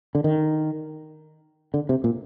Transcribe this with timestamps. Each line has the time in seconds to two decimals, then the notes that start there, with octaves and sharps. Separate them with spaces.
0.15 D3
0.24 D#3
1.74 D3
1.89 C3
2.04 A#2